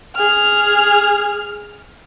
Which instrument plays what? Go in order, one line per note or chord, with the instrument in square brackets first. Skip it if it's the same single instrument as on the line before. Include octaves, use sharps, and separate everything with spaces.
[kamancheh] G#4 F6